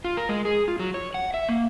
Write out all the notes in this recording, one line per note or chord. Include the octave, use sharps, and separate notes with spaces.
F4
A#4
G#3
G#4
F4
F#3
C#5
F#5
E5
A#3